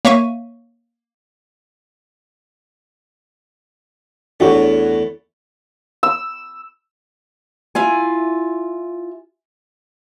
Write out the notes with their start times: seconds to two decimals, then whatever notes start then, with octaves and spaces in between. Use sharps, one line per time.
0.05 A#3 C#5 E5 F5 C#6 D#7
4.40 E2 A3 D4 F#4 C#5
6.03 E6
7.75 E4 F4 G#5